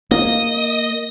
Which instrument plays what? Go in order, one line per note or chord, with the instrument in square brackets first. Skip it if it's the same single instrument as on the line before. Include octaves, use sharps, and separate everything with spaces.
[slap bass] A#3 [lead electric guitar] D#5